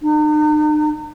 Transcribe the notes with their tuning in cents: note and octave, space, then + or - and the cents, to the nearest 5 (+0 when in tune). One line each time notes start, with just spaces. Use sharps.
D#4 -45